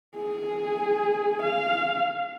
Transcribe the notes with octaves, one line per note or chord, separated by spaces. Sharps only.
G#4
F5